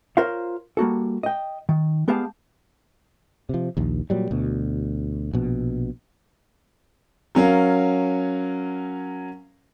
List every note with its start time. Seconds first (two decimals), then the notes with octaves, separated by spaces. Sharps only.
0.17 F4 A#4 C5 C#5 F5
0.77 G3 A#3 F#4 A4
1.23 D#5 G5
1.69 D#3
2.08 G#3 B3 G4 G#4 F5 A5
3.49 C3 F3
3.77 A#1 D#2
4.10 A#2 F#3 G3
4.31 D2 B2
5.33 A#1 B2
7.35 F#3 C#4 A#4 F5